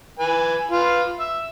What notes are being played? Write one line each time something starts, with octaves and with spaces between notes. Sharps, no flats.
B4 G#5
F4 B4
E5